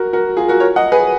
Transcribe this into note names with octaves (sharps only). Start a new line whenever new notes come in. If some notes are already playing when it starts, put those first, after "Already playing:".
Already playing: F#4 A#4
F#4 A#4
F4 G#4
F#4 A#4
A#4 C#5
D#5 F#5
G#4 B4